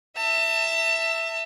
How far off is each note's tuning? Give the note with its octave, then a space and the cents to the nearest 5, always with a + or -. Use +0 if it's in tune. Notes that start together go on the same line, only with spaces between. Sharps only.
E5 +0 A5 +35